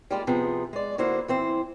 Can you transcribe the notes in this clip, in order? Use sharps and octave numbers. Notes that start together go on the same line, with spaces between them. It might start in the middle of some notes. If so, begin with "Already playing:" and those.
G3 G#3 A#3 F4 G4 D5
C3 F3 B3 G#4
G#3 D5
D3 A#3 E4 F#4 C5
E3 C4 C5